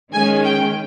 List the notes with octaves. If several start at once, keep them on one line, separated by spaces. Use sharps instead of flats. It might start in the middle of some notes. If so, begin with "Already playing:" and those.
D#3 G#3 C#4 G#5
G5